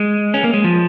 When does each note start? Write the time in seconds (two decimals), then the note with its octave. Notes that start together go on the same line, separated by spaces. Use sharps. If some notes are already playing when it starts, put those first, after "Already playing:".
Already playing: G#3
0.34 C#4
0.44 A#3
0.54 G#3
0.64 F3